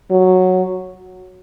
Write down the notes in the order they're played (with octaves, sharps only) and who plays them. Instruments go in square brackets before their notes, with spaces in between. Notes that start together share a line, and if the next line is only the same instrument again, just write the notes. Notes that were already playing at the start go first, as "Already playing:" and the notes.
[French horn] F#3